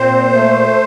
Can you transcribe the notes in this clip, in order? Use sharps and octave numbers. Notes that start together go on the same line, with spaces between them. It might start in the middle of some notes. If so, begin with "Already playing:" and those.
Already playing: A#2 C4 C5
A3